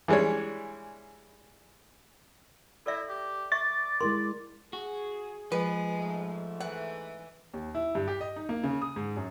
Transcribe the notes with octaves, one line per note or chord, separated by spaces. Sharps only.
E3 G3 G#3 D4 C#5
E4 A4 D5 E5
G4
D5 E5 C#6 A6
G#3 E4 A#4 C6
F#4 G#4
F3 G#3 B4
G#2 A3
E3 F#5
D#2
E4
G2
G4
D#5
D#4
A#3
C#3
D#6
G#2
F#2